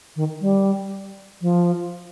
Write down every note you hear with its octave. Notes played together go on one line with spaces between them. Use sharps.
D#3
G3
F3